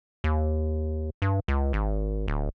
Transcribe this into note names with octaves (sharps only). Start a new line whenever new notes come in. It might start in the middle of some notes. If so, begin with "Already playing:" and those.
D#2
G2
C#2
G#1
D1